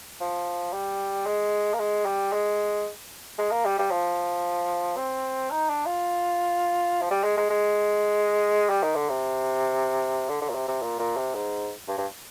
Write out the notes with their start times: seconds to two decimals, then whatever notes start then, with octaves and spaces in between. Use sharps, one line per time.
0.20 F3
0.73 G3
1.26 G#3
1.73 A#3
1.79 G#3
2.05 G3
2.32 G#3
3.38 G#3
3.51 A#3
3.65 G3
3.79 G3
3.91 F3
4.97 C4
5.51 D#4
5.69 D4
5.86 F4
7.01 F3
7.11 G3
7.24 G#3
7.37 G#3
7.50 G#3
8.69 G3
8.83 D#3
8.95 D3
9.09 C3
10.29 D3
10.41 D3
10.50 A#2
10.55 C3
10.68 C3
10.82 A#2
10.99 A#2
11.17 C3
11.35 G#2
11.88 G2
11.98 G2